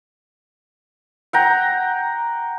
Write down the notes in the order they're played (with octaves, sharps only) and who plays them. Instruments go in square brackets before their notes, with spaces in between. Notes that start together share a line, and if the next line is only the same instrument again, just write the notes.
[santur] F#5 G5 A#5